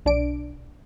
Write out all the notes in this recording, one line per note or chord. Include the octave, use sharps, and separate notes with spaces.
B1 D4 D5 D7